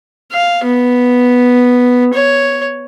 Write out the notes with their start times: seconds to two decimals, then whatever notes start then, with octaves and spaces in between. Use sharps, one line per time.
0.32 F5
0.64 B3
2.14 C#5